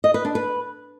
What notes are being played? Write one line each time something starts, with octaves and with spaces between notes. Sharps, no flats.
D#5
B4
D4
B4